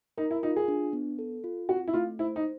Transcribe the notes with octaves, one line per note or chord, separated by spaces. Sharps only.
D#4 A#4
E4
D#4 F4
G#4
D4
B3
A4
F4
C4 F#4
E4
A3 F4
E4 C5
D#4